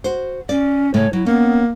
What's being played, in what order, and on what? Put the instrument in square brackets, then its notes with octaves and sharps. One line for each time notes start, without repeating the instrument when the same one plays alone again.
[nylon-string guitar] F#4 C5
[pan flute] C#4 [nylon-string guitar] D5
[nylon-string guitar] A2 C#3 A3 [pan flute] C#5
[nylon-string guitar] F#3 [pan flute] E4
[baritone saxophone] A#3 [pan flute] B3 [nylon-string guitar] C#4